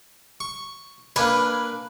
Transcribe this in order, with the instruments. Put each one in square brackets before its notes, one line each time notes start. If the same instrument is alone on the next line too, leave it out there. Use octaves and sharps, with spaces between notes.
[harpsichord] C#6
[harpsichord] A#3 D4 G#5 [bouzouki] B4